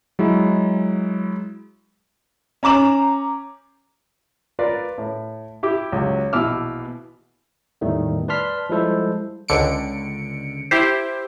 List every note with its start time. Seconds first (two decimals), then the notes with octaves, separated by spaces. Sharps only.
0.19 F#3 G#3 E4
2.63 C#4 A#5 D6 E7 F#7
4.59 F4 A#4 B4 D5
4.98 A2
5.63 E4 G4 D6
5.92 C#2 F#3
6.33 A#1 B2 E3 D6 E6 F6
7.81 E2 A2 D#3 G3 A3
8.28 B4 D5 A5 C6 F6 B6
8.70 F3 G3 G#3 E4 A4 C5
9.48 C#2 D3 C#7 D7
10.71 E4 G4 C5